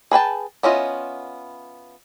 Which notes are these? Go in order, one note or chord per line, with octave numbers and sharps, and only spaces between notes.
G#4 B4 G5 A5
B3 C#4 E4 F4 D#5